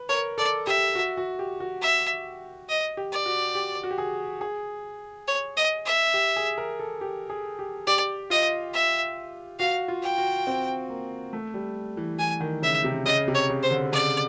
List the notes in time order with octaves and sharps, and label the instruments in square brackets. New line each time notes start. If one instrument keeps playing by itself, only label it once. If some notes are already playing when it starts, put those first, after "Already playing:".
Already playing: [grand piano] B4
[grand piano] A#4 [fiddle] C#5
[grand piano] A4 [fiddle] D5
[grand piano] G4 [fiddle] E5
[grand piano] F#4
F#4
G4
F#4
[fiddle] E5
D#5
[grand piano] G4
[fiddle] D5
[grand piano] F#4
G4
F#4
G4
G#4
G#4
[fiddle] C#5
D#5
E5
[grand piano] G4
G#4
A#4
A4
G4
G#4
G4
[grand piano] G4 [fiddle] D5
[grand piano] F4 [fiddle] D#5
[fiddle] E5
[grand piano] F#4 [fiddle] F5
[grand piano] F4
[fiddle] G5
[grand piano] F#4
C4
A#3
A3
G3
E3
[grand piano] E3 [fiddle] G#5
[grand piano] D#3
[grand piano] C#3 [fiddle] E5
[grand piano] C3
[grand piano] C#3 [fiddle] D#5
[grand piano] C3
[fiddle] C#5
[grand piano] C#3
[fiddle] C5
[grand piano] D3
[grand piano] C#3 [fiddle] D5